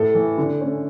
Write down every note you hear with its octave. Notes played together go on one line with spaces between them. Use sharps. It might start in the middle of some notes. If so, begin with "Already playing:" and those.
Already playing: A2 A4
E3 A3
D3
A3 C#4